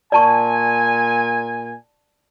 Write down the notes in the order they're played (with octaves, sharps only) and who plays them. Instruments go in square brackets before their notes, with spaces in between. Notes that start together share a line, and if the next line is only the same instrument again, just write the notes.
[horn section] A#2 G#5 [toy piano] D5 A5 C#6